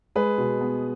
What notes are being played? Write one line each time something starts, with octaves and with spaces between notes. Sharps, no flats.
G#3 G#4 B4
B2
B3